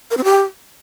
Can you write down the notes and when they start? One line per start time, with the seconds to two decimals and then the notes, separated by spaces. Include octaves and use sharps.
0.11 A#4
0.17 C4
0.24 G4